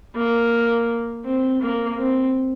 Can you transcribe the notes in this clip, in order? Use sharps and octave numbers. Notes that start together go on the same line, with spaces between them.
A#3
C4
A#3
C4